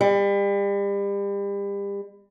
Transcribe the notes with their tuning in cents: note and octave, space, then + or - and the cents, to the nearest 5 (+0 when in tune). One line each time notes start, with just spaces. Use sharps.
G3 +35